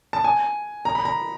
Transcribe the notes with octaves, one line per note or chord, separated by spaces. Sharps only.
A5
G#5
A#5
B5
A#5